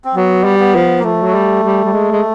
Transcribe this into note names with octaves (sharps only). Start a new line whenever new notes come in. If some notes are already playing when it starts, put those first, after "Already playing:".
C4
F#3 B3
G3
B3
F3
A#3
F3 A3
F#3
G3
G3
G3
G#3
G#3